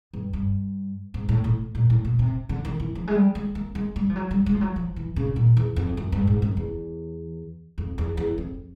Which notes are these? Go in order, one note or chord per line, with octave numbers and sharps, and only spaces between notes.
G2
G2
G#2
A2
A2
A#2
A2
B2
C3
D3
D#3
E3
F3
G#3
G3
G#3
A#3
G#3
G3
F3
F#3
G3
G#3
F3
F#3
F3
E3
C#3
A#2
E2
F2
F#2
G2
G#2
F#2
E2
F2
E2
E2
F2